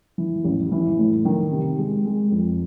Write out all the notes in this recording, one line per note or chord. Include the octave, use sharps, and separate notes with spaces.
E3
A1
E3
A2
D#3
C3
G#3
G#3
F2